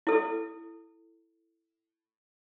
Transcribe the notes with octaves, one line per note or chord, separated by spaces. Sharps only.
E4 A4